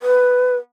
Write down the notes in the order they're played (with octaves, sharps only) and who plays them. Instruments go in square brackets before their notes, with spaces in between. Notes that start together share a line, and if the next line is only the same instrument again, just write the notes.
[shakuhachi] B4